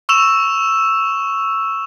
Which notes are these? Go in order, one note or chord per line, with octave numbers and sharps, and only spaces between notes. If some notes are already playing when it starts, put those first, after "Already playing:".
C#6 E6 E7 F7